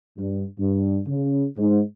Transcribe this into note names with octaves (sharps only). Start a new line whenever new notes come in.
G2
G2
C#3
G#2